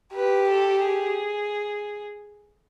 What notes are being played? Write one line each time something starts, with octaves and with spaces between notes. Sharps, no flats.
G4 B4
A4
G#4